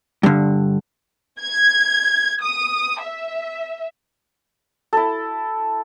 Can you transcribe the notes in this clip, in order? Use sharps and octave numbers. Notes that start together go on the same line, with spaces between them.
G2 D3
G#6
D#6
E5
E4 A4